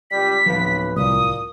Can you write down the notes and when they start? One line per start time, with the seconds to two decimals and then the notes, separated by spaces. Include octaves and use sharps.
0.11 C#2 G3 B6
0.46 D1 B1 C#3 F3 B4
0.96 C2 A#2 D#6